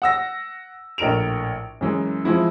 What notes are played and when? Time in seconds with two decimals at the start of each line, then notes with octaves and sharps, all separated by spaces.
0.02 F#5 E6 A#6
0.98 A#1 A2 A#4 D7 F7
1.81 F#2 E3 G#3
2.25 E3 F3 G#3 C4 E4